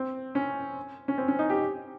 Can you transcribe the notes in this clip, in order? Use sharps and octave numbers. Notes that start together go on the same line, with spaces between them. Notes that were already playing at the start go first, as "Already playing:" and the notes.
Already playing: C4
C#4
C#4
C4
C#4
D#4
G4